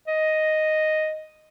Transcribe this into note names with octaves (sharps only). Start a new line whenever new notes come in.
D#5